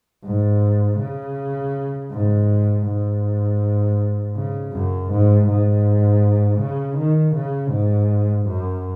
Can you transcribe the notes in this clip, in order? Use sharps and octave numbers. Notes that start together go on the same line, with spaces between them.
G#2
C#3
G#2
G#2
C#3
F#2
G#2
G#2
C#3
D#3
C#3
G#2
F#2